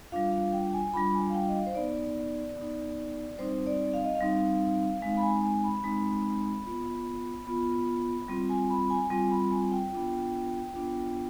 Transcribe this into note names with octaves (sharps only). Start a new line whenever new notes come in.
G3 D4 F4 F5
F5
G5
G#5
G3 D4 F4 B5
G#5
F5
G5
D#5
F5
C5
B3 D#4 D5
B3 D#4
G3 C4 D#4 C5
D5
F5
D#5
F5
G3 C4 D#4
G#3 C4 D#4 F5
B5
G#5
G#5
B5
G#3 C4 D#4
B3 F4
B3 F4 B5
G3 C4 F4
G#5
B5
G#5
G3 C4 F4 G#5
B5
G#5
G5
B3 D4 F4
B3 D4 F4